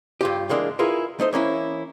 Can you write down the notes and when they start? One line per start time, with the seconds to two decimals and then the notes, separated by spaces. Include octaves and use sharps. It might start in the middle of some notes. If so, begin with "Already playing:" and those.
0.21 G2 F4 G4
0.49 E3 G#3 A#3 D4
0.79 E4 F4 G#4 A#4 B4
1.20 A3 D#4 C5
1.33 E3 A#3 C#4 E4